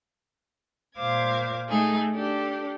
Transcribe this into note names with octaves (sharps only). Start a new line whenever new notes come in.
A#2 C5 F5 D6 G#6
A3 D#4 G#4 A4
D4 G4 A4